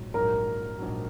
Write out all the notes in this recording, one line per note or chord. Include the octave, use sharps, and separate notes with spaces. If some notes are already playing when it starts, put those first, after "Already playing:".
Already playing: A#1 G#2 F#3
A#1 G#2 F#3 A#4
A#1 G#2 F#3